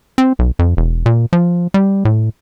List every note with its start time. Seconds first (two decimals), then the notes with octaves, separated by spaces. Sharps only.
0.18 C4
0.39 B1
0.59 F2
0.77 E1
1.06 A#2
1.33 F3
1.74 G3
2.05 A2